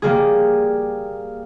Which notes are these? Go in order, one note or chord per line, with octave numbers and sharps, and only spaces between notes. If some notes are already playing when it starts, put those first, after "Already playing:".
G3 A#3 G#4